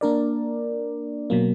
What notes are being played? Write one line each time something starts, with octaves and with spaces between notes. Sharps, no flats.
A#3 D4 A#4 D5
B2 F#3 A#3